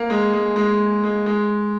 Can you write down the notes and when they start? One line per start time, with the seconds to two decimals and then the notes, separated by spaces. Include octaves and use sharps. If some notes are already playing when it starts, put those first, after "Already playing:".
Already playing: A#3
0.10 G#3
0.33 G#3
0.56 G#3
1.03 G#3
1.26 G#3